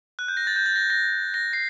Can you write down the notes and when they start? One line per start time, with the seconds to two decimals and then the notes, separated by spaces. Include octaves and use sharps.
0.19 F#6
0.28 G6
0.37 A#6
0.47 A6
0.56 G6
0.66 A6
0.76 A#6
0.90 A#6
1.34 A#6
1.53 C7